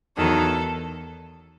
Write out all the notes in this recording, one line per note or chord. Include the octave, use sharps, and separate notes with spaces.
E2 D#3 F#3 A4